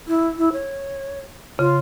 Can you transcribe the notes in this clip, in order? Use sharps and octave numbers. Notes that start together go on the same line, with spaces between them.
E4
E4
C#5
C#3 F4